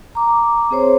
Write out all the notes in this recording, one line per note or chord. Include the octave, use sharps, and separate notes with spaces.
A#5 D6
C4 G#4 C5 C#5